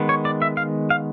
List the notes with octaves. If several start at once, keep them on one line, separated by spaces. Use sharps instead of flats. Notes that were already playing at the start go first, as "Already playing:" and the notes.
Already playing: D#3 G#3 B3
C#5
D5
E5
F5
F5